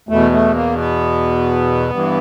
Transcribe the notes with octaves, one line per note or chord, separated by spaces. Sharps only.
E2 B2 A3
A3
A#3
B3
G2 E3